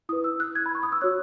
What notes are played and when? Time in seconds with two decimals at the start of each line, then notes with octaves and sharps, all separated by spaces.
0.09 E4 B4 D#6
0.24 E6
0.40 F#6
0.55 G#6
0.66 B5
0.75 C#6
0.83 D#6
0.92 E6
1.01 F#4 C#5 F#6